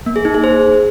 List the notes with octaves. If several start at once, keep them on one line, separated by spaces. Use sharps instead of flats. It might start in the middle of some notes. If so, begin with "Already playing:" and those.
A#3
G#4
D#4
G#4
C5